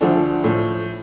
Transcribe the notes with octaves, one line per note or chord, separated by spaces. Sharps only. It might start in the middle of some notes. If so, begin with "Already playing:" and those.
D2 D3 F3 A3 D4
A2 F3 A3